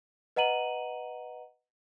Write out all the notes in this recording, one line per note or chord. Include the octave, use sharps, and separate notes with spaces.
B4 D#5 F#5 A#5 D#7 F#7